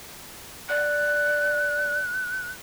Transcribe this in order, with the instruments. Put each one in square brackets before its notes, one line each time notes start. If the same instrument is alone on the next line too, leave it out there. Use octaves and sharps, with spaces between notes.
[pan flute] D5 [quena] F#6